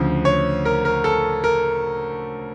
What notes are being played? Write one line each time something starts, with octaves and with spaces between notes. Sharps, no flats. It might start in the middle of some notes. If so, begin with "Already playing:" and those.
Already playing: D2 C#3 F3
C#5
A#4
A#4
A4
A#4